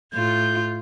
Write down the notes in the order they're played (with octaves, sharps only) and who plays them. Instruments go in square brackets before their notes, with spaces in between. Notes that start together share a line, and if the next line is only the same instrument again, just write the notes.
[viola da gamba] A2 F4 [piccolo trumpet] G6